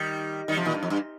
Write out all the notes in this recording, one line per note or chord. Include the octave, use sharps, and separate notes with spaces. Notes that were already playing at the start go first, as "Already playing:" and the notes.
Already playing: D#3 G3
D#3 G3
C3 F3
A#2 D#3
G2
F2
G2